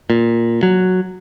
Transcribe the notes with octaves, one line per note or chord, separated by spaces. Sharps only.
A#2
F#3